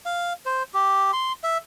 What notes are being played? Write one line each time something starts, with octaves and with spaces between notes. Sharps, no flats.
F5
C5
G4
C6
E5